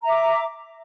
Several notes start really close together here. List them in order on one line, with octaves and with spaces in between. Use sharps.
A#5 E5 D6